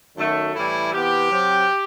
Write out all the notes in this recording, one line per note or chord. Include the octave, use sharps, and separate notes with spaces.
F#2 D#3 F#3 A3
A2 E3 G3 E4
C3 E3 B3 G4
C3 F#3 C4